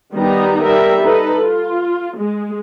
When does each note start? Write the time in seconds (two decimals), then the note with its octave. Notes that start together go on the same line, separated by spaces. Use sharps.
0.14 D#3 G3 B3 D#4 G4 A#5
0.62 G3 A#4 E5
1.03 D#4 A4 B4
1.43 F4
2.18 G#3